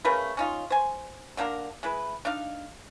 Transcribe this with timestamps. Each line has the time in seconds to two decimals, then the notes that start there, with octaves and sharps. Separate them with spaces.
0.05 C#3 A3 A#4 B4
0.37 C#4 D#4 F4
0.70 C5 G#5
1.37 D3 A#3 D4 A#4
1.83 G#3 E4 B4
2.25 D4 D#4 F5